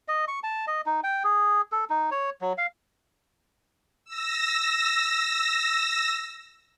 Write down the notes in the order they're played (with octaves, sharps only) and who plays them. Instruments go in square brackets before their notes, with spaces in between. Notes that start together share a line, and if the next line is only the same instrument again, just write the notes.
[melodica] D#5
C#6
A5
D#5
D#4
G5
G#4
A4
D#4
C#5
F#3
F5
[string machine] E6 A#6